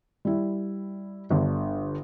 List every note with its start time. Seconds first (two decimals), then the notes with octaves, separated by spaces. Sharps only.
0.25 G3 E4
1.30 G1 D3